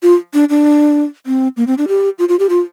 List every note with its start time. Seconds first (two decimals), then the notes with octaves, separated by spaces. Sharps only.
0.03 F4
0.34 D4
0.50 D4
1.26 C4
1.57 A#3
1.67 C4
1.78 D4
1.88 G4
2.19 F4
2.29 F4
2.39 G4
2.49 F4